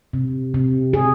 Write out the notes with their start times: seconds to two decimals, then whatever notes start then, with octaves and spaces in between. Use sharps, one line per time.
0.13 C3
0.54 C3
0.93 C3 G#4